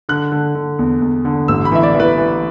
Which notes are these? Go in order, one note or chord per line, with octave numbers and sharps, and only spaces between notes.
D3 F#6
D3
D3
E2
E2
D3
A1 E6
B5
E3 E5
D5
E3
B4
E3